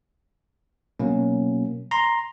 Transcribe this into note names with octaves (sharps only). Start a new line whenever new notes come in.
B2 F#3 A#3 C#4
A#5 C6